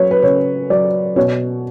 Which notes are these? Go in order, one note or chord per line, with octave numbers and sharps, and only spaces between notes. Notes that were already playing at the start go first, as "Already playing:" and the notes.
Already playing: F#3 B4 C#5
B4
C#3 C#5
F#3 D5
B2 C#5